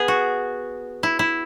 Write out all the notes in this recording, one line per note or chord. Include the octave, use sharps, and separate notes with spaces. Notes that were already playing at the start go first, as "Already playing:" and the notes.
Already playing: B3 G#4
F#4
E4
E4